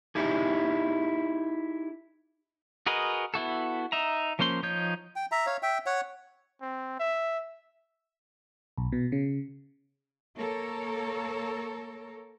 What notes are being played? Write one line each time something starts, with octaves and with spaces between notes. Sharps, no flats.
D#4 E4 G4 G#4
F#4 G#4 A#4 B4 D#5
B3 E4 F#4 A4
D#4 E5 A#5
F3 A#3 C#4 C5 C6
F3 D#4 C#5 G6
G5
E5 A#5
C#5 F5
E5 G5
C#5 F#5
C4
E5
B1
B2
C#3
A#3 A4 A#4 C#5